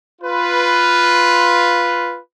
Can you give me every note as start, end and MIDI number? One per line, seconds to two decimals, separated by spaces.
0.22 2.18 65
0.22 2.18 71